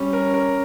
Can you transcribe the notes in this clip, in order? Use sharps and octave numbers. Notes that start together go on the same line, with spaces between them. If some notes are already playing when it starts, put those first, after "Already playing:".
Already playing: G3 C#4
A#4
A#4